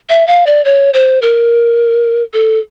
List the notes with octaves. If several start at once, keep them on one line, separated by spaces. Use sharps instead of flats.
E5
F5
D5
C#5
C5
A#4
A4